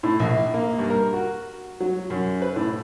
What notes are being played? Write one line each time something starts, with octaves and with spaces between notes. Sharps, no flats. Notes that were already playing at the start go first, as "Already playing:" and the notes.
A2
A#1
A#3
G2
A#4
F#4
F#3
F#2
B4
A2